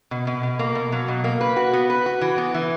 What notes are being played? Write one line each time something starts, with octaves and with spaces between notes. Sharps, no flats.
B2
B2
B2
A#3
B2
F#3
B2
A#3
B4
F#4
B3
B4
F#4
E3
B3
E3